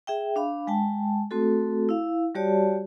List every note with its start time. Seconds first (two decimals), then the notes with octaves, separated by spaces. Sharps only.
0.07 G#4 E5 G5
0.36 D4 F5 B5
0.67 G#3 G5 A5
1.31 A3 C4 F#4 A4
1.89 E4 F5
2.35 G3 F#4 G4 C#5 D5 A5